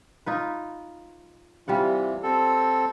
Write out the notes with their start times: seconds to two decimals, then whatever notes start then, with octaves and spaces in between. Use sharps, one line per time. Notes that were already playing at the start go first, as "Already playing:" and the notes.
0.26 D#4 F4 B4
1.68 C3 E3 G3 F4 F#5
2.23 C4 A4